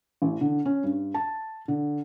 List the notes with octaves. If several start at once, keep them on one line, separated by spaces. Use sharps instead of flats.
A1
D3
C#4
G2
A5
D3